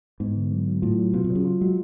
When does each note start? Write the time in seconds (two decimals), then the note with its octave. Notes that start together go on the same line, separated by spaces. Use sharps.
0.20 G#2 B3
0.36 D3
0.52 F#3
0.67 F#3
0.82 A2 F4
0.99 F#3
1.14 B2 F4
1.24 B2
1.30 F#3
1.35 C#3
1.45 F4
1.61 F#3 G#3